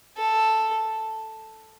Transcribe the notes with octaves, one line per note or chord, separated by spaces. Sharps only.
A4